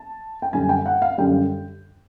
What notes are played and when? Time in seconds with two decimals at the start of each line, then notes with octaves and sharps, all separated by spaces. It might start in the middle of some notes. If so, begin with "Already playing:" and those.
Already playing: A5
0.42 G5
0.53 F#2 D3 G3 G#5
0.69 G5
0.86 F#5
1.02 F5
1.18 F#2 D3 G3 G5